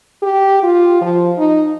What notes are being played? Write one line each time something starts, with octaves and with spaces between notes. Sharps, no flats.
G4
F4
F3
D#4